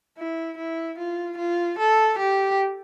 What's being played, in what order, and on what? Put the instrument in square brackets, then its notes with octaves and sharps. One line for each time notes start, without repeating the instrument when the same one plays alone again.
[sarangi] E4
E4
F4
F4
A4
G4